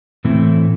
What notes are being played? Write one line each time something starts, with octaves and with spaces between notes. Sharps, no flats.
A2 E3 A3 C4 E4